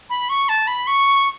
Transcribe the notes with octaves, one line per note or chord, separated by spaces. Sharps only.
B5
C#6
A5
B5
C#6